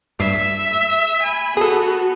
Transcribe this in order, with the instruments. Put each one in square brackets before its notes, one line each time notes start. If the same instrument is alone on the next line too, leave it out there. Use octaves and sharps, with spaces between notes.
[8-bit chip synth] G2 C7 [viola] E5
[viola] G#5 B5
[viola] B3 F#4 [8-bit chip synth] G#4 A4